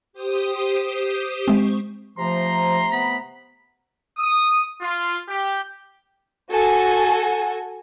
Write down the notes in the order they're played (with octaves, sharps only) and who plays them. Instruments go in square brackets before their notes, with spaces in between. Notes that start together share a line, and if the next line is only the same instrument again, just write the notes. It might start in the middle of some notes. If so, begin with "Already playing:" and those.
[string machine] G4 C5 D#6
[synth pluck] G#3 C4 [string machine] C#6
[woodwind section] C3 A3 A#5 [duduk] F3 [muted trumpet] C6
[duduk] B3 [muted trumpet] B5
[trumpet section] D#6
F4
G4
[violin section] F#4 A4 G#5